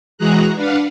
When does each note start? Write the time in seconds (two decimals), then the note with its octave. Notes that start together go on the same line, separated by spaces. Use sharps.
0.18 E3 G#3 F#4 G#4 A#5 F#6
0.55 D4 B4 F5 F#5